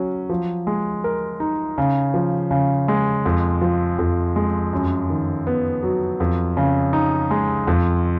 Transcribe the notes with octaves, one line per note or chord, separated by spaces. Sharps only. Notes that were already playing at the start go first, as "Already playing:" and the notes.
Already playing: F#3 C#4
F3
G#3
A#4
D#4
C#3
F3
C#3
G#3
F2
F3
F2
G#3
F#2
D#3
B3
F#3
F2
C#3
D#4
G#3
F2